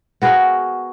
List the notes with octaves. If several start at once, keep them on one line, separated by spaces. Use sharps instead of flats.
B3 F#4 G#4 A#4